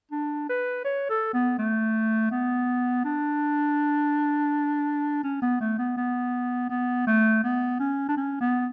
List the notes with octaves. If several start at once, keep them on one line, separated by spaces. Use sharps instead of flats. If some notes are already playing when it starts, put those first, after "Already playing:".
D4
B4
C#5
A4
B3
A3
B3
D4
C#4
B3
A3
B3
B3
B3
A3
B3
C#4
D4
C#4
B3